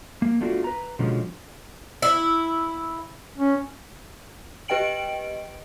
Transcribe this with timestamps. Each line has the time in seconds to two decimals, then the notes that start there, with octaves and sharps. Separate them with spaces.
0.22 A#3
0.41 A3 B3 D4 F4 F#4
0.64 B4 A#5
0.99 B2 D3 F3 G#3 C#4
2.02 E4
3.38 C#4
4.68 G4 B4 D#5 G5 D7 F#7